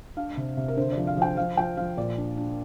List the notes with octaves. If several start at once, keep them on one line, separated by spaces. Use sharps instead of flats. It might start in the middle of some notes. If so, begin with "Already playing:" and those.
D4 F5
C3
C3
A#4
D3 C5
F3 D5
F5
F3 G5
F3 F5
F3 G5
F3 F5
A#2 D5
D4
D4